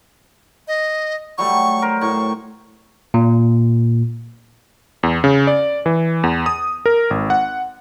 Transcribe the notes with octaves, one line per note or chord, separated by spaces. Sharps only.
D#5
F#3 G3 A3 C#6
A#4 C5
A2 C#6
A#2
E2
C#3
D5
E3
E2
D#6
A#4
G#1
F#5